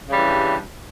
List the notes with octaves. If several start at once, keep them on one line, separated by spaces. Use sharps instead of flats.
G2 C#3 E3 G3